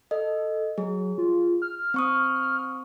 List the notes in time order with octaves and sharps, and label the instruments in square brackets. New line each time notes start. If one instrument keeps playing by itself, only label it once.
[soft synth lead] A4 [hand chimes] D#5
[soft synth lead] F#3 [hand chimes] G#4
[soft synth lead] F4
F6
[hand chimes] C4 C#6 D#6